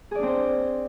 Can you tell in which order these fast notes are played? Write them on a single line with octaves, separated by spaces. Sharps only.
G#4 D5 D4 C4 C5